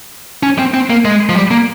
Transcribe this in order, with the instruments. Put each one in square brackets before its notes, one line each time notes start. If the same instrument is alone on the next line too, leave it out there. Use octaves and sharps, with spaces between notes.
[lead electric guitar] C#4
C4
C4
A#3
G#3
F3
G3
A#3